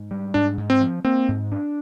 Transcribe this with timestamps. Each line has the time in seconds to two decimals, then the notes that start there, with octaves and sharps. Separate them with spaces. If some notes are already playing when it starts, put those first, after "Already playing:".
Already playing: G#2
0.11 G3
0.34 G#2 D4
0.57 G#2
0.70 C4
0.81 F3
1.05 A#3 C4
1.28 G#2
1.52 D4